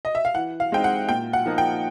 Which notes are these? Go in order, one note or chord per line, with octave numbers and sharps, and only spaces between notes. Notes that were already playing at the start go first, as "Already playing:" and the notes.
D#5
E5
F5
E3 F#5
F5
G#3 C4 D#4 G5
F#5
A#2 G5
F#5
F3 A#3 D#4
G5